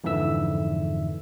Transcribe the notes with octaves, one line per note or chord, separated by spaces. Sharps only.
F2 G#2 D3 E3 E5 E6